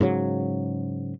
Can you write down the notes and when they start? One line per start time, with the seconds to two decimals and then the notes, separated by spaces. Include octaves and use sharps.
0.01 G#2 C#3 F#3